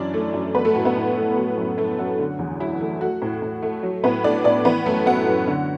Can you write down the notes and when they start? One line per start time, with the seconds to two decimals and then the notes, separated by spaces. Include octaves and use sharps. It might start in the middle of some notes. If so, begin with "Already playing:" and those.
Already playing: F#2 E3 D4 D5
0.14 A3
0.34 F#2
0.55 A3 B3 B4
0.65 A3 A4
0.75 A2 F#4
0.85 B3 B4
0.96 A2
1.17 A3
1.37 F#3
1.58 F#2
1.78 A3 A4
1.98 F#2 F#4
2.19 D3
2.39 E2
2.60 F#3 E4
2.81 A3
3.01 A3 F#4
3.22 A2
3.42 A2
3.62 A3
3.83 F#3
4.04 A2 B3 B4
4.24 A3 D4 D5
4.44 A2 D4 D5
4.65 E3 B3 B4
4.86 F#2 A3 A4
5.06 B3 F#4 F#5
5.27 F#2
5.47 D3